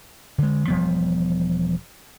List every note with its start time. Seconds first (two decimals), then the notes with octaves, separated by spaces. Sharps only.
0.38 D3 G#3
0.68 E1 F3 G3 B3